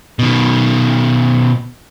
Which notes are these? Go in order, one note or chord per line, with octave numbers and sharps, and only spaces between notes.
B2 D#3